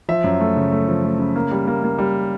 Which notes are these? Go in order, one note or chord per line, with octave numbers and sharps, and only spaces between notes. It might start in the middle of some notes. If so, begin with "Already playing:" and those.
F3 E5
F#2
A3
C#3
A3
F3
A3
C#3
A#3
G3
A#3
A#3
G3